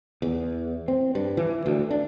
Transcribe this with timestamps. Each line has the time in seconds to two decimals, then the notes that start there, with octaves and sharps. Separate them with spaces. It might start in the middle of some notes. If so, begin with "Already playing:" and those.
0.22 E2
0.88 C4
1.15 G2
1.37 E3
1.66 D2
1.90 D4